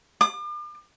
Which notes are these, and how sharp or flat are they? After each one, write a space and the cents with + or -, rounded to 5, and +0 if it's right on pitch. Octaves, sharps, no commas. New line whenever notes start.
D6 +40